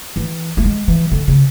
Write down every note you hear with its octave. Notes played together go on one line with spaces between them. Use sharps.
E3
A3
G#3
E3
D3
C#3